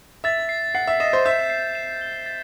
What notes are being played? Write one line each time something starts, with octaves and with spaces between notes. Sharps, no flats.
E5 A6
C7
F#5 C7
E5
D#5 E7
C5
E5 G6
C7
E7
G7
A6